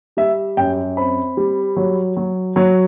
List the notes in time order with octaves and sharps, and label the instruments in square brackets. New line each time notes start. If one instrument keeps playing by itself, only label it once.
[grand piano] G3 E5
F#2 G5
C4 B5
G3
F#3
F#3
F#3